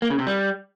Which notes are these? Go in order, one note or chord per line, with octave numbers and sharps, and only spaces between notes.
A#3
C#3
C3
G3